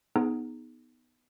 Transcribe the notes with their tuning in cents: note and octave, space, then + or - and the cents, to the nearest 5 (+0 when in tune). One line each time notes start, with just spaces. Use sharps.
B3 +0 D#4 +0 G#4 +5